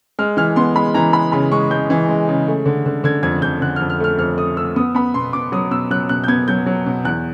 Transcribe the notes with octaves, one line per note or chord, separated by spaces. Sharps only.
G#3 F6
E3 F6
B3 C6
G#3 B5
E3 A#5
G#3 B5
C#3 B5
G#3 C#6
G#3 G6
E3
G#3
C#3
A3
D3
D3
D3 G#6
F2 G#6
F2 G6
D3 F#6
F6
F2
F6
A3 F6
F2 F6
A3 D#6
A3 E6
B3 D#6
B3 B5
B2 C6
B2 D6
F#3 D#6
B2 E6
F#3 F#6
B2 F#6
G6
B3 G#6
F#3 G6
F#3
B2
E2 F#6